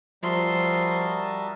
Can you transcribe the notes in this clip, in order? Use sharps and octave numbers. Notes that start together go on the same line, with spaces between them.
F3 G3 F#4 A#4 E5 A5 C6 D#6